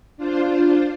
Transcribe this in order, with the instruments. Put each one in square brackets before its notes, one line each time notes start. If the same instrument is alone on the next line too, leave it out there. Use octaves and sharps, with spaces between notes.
[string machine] D4 F4 C5